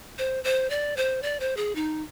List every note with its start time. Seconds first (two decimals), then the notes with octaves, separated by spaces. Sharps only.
0.18 C5
0.44 C5
0.70 D5
0.97 C5
1.23 D5
1.40 C5
1.57 G#4
1.75 D#4